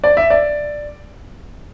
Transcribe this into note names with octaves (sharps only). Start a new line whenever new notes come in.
D5
E5
D5